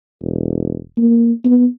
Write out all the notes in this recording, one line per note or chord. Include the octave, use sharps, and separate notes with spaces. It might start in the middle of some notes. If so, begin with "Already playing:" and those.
E1
A#3
B3